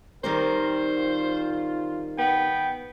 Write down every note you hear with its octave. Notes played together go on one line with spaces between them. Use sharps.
D#3 G3 C4 A#4 C5
F4
B3 G5